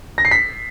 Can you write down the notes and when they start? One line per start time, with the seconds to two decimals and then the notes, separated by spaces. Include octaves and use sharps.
0.18 A#6
0.25 C7
0.31 B6